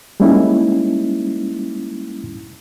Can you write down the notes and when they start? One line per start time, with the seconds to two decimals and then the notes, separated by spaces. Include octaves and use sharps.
0.20 G3 G#3 A#3 C#4 D#4 E4